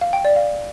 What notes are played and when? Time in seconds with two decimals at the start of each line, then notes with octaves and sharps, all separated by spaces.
0.01 F5
0.13 G5
0.25 D5
0.36 F5